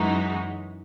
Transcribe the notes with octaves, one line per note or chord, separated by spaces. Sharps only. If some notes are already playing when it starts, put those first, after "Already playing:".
Already playing: F#2 E3 G#3 D#4 F#4